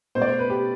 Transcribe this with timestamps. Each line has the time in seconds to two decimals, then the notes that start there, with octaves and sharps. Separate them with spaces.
0.15 B2 C5
0.19 A3 D5
0.27 C5
0.39 B4
0.50 G4